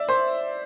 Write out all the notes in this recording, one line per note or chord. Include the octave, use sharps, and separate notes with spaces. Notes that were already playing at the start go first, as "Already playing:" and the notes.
Already playing: D5 E5
C5